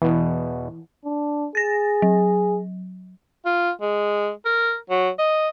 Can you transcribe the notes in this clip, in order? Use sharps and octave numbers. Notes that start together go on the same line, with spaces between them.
E2 B2 E3
D4
G#4 A6 A#6
F#3
F4
G#3
A#4
F#3
D#5